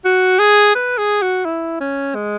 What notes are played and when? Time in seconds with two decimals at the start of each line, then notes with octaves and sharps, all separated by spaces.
0.05 F#4
0.39 G#4
0.75 B4
0.98 G#4
1.22 F#4
1.45 E4
1.81 C#4
2.15 G#3